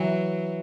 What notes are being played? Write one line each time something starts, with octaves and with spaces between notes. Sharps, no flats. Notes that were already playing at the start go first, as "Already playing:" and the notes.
Already playing: E3 F#3